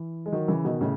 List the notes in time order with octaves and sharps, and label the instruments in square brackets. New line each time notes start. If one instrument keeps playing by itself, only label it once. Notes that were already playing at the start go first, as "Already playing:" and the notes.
Already playing: [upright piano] E3
G#3
D#3 F#3
C#3 E3
B2 D#3
A2 C#3